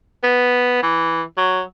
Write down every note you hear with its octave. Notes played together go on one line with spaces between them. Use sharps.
B3
E3
F#3